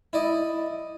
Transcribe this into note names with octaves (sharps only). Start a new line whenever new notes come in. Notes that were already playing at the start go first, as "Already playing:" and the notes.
E4 D5 D#5